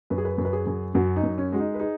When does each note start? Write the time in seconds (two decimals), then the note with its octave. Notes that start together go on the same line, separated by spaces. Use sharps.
0.10 F#2 B4
0.18 G#4
0.25 B4
0.38 F#2
0.45 B4
0.53 G#4
0.67 F#2
0.95 F#2 F#4
1.16 D#4
1.23 F#2
1.38 C#4
1.52 G#3 F#4
1.60 D#4
1.74 B4
1.80 D#4 G#4